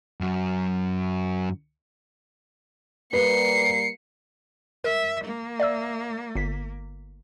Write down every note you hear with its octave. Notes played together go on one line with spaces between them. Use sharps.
F#2 F#3
G3 A#3 B4 C7 C#7
A#4 E5
A#3
D5 E5 E6
G1 B6